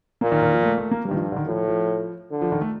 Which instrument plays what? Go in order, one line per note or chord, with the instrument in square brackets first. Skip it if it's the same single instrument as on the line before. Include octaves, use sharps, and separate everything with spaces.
[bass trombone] A#2 [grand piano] A#3
[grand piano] D#3
D#3
F3
A3
A3
A#3
[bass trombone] G2 [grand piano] G3
[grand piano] D#3
F3
D3
D#3
[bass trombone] A2 [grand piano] F3
[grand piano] F3
[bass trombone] D3
[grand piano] F3
D#3
A3